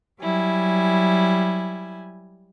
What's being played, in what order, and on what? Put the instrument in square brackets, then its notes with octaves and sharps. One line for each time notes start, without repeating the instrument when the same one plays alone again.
[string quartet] F#3 G3 E4 G#5